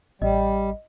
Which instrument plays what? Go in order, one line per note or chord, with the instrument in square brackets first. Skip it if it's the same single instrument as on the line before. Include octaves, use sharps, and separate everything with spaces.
[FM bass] A1 [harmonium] G3 [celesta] D#5